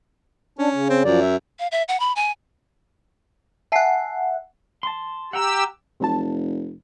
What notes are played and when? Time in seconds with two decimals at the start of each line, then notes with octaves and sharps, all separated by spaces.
0.59 C#4 D4
0.74 C#3
0.89 C4
1.05 F#2 F3 D5
1.20 E5
1.59 F5
1.71 E5
1.88 F#5
2.00 B5
2.16 G#5
3.72 E5 F#5 G#5 A5 C7
4.83 A5 C6
5.33 G4 F#5 G5 A#5 E6
6.00 F1 C3 F#3 A5